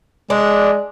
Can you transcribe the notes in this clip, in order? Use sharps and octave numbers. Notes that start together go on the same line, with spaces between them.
G#3 D4